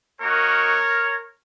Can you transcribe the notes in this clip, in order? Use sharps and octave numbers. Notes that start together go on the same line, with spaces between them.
A#3 D#4 F#4 A#4 C#5